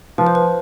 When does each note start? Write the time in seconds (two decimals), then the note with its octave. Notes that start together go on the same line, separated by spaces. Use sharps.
0.18 F3 B4
0.27 C5
0.35 B4